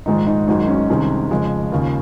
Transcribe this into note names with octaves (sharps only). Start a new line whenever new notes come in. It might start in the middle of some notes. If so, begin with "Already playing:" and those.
A#1 G#2 D#3 G#3 D#4
D#4
G#1 F#2 D#3 G#3 D#4
C#4
C2 C3 D#3 G#3
F2 C#3 F3 G#3
D#2 C#3 F3